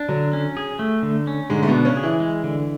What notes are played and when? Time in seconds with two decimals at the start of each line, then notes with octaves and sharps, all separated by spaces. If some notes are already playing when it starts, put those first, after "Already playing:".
Already playing: D4
0.09 D3 F#3
0.33 C#4
0.57 G#4
0.79 A3
1.03 D3
1.27 C#4
1.50 G#2 D3 G#3
1.63 A3
1.67 B2 B3
1.74 D4
1.85 C#3 C#4
1.97 G#4
2.03 E3 E4
2.20 G#3
2.44 D3